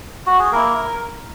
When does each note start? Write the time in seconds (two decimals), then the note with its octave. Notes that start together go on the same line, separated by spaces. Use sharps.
0.26 F#4
0.39 G#4
0.52 A#3 E4 A#4